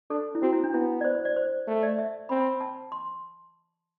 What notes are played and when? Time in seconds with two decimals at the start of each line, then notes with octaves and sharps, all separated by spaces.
0.10 D4 A4
0.35 E4
0.42 C4 F#4
0.52 E4
0.64 D4
0.73 B3 E4
1.01 D5
1.04 C5
1.15 C5
1.25 D5
1.36 C5
1.68 A3
1.83 D5
1.98 E5
2.29 C4 B5
2.41 B5
2.61 A5
2.92 C6